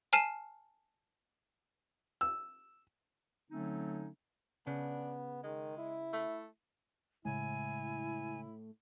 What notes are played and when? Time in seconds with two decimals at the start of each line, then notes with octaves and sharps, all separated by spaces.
0.13 G#5 A5 F6 C7 D#7 E7
2.21 E6
3.51 D3 F#3 A3 C4 C#4 D#4
4.67 C#3 B3 D4
5.44 D#3 G#3
5.78 E4
6.13 A3
7.25 A2 C#3 G#3 E4 G#5